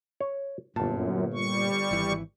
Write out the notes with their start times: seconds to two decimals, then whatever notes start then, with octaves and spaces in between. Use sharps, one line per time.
0.20 C#5
0.76 G1 F#2 A#2 A5
1.34 G3 C#6
1.91 G#1 E3